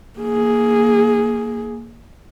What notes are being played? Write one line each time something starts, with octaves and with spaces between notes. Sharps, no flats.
A#3 G#4